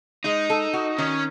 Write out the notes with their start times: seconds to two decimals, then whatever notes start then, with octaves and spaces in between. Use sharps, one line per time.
0.24 G#3 D#4
0.50 A4
0.73 F#4
0.98 D#3 C#4